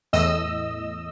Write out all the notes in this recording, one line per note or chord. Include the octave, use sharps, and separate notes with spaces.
E2 A2 D#5 E6